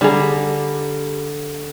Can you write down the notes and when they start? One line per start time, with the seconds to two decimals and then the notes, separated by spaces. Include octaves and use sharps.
0.01 D3 G3 G#4 A#5